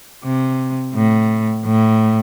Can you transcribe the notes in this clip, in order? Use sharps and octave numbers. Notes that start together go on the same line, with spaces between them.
C3
A2
A2